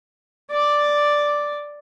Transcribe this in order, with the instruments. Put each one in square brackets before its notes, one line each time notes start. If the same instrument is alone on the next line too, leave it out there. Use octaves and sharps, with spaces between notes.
[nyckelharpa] D5 D6